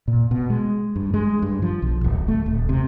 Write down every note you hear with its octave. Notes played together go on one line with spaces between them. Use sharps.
A#2
B2
G#3
G2
G#3
G2
F3
B1
D1
A3
D#1
C3